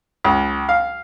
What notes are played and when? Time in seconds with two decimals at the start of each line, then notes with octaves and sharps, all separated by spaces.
0.24 C#2
0.69 F5